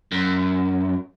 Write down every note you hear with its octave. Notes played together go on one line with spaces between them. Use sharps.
F#2